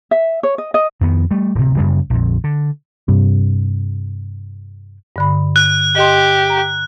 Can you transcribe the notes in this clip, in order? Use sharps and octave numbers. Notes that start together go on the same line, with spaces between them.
E5
C#5
D#5
D#5
F2 D#3 B3
G3 A3
D1 C3
F#2 C#3 G3
A#1 F2
D3
G2 C3
G2 D3 B5
F#6
G4 D#5 C6
A#5